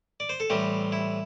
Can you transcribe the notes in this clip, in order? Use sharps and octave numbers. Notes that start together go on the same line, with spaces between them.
D5
C5
A4
A2 E3 G3 C4 G4
E4